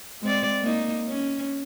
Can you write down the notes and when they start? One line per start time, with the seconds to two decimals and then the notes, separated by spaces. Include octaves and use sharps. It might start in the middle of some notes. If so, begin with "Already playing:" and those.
0.22 G#3 C4 D5
0.61 A#3 D#4
1.08 C#4